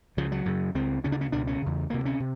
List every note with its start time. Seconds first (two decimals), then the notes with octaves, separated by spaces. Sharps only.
0.17 C#2 C#3 F3
0.32 F#3
0.46 F#2 C#3
0.75 C#2 C#3 C4
1.04 D2 C#3 C#4
1.12 D4
1.21 C#4
1.32 C#2 B2 D4
1.47 C#4
1.62 E2 C#3
1.90 D2 C3 A#3
2.06 C#4
2.20 C3